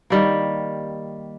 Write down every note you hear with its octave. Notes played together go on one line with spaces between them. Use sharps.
D#3 G3 A#3